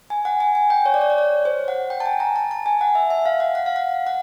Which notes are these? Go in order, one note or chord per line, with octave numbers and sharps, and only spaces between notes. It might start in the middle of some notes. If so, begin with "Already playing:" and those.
G#5
F#5
G#5
G#5
G5
C#5
D5
C#5
D5
C#5
C5
F#5
G5
A5
G#5
A#5
A5
A5
G#5
F#5
E5
E5
F5
F#5
F#5
F5
F#5
F#5